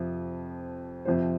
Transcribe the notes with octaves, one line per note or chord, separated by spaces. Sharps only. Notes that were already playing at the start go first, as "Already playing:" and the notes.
Already playing: F2 C3 F3
F2 C3 F3 C5